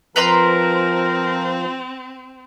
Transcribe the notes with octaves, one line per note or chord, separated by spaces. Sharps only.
F3 C4 A#4 B4 A#5 C6